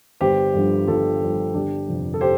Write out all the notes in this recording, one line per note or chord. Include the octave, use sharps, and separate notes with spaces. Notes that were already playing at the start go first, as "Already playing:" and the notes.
G1 G4 C5
G2 D3 F3
G1 F4 A4
G2 D3 F3
G1 D4 G4
F2 C3 F3
A4
G4 C5